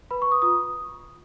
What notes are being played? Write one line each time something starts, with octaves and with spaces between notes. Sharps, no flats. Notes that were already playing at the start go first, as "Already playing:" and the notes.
B4 B5
B4 C#6
D#6
F4 D#6